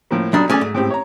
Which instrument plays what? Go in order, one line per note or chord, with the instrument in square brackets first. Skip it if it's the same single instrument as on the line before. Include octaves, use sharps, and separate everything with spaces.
[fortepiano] A2 F3 A#3
[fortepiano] B1 A#5 D#6 [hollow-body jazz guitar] G3 D4
[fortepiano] A3 G#5 [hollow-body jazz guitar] C#4 G#4 D5
[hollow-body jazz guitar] G#2
[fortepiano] A2 C4 G4
C#5 A#5